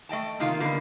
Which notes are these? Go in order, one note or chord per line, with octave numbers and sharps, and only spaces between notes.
A3 D#5 G5 A5
C3 D#3 A#3 F4
D3 G3 A#3 B3